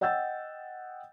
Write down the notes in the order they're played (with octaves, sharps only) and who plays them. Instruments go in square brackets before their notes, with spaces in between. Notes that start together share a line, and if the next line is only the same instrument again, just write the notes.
[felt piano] D#5 F#5 G5 E6 G6 A6